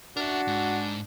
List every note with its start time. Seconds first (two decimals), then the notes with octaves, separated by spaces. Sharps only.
0.17 D4 F#4 A#4 E5
0.47 G#2